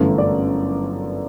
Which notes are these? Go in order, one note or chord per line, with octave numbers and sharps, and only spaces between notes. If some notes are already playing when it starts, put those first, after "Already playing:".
Already playing: G1 F#2 E3 A3
D5